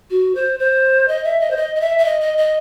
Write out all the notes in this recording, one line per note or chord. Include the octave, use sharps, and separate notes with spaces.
F#4
C5
C5
D#5
E5
D#5
C5
D#5
D#5
E5
E5
D#5
D#5
D#5